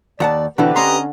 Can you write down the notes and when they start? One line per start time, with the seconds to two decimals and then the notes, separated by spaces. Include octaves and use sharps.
0.20 D#2 D5 F#5 A5
0.58 B2 D3 E3 C4 E4 G4 B4
0.76 C#4 D#5 A#5 C6